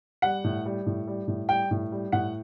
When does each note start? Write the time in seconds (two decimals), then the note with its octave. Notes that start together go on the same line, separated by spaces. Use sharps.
0.22 G3 F#5
0.44 A2
0.66 G3
0.86 A2
1.07 G3
1.28 A2
1.49 G3 G5
1.71 A2
1.92 G3
2.12 A2 F#5